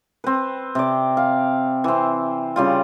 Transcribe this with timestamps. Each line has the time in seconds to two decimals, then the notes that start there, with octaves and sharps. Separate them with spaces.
0.24 C4 B4
0.75 C3 D5
1.17 F5
1.84 E3 C4
2.56 C#3 G3 F4